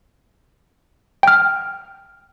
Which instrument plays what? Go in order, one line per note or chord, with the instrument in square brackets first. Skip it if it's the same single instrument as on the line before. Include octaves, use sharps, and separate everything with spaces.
[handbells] G5 F6